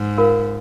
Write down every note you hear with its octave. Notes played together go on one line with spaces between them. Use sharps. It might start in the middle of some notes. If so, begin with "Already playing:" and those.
Already playing: G#2
F4 A#4 F5